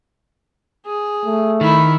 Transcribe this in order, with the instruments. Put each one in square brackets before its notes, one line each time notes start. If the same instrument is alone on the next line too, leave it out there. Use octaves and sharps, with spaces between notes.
[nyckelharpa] G#4
[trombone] A3
[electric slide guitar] D#3 [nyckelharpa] E4 B5